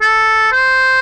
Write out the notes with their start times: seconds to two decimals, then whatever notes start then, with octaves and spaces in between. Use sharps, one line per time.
0.01 A4
0.52 C5